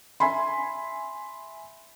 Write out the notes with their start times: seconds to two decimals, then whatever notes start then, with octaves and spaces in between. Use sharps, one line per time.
0.20 E5 G#5 B5 C6